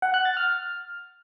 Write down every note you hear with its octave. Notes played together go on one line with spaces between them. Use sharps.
F#5
F#6
A6
F6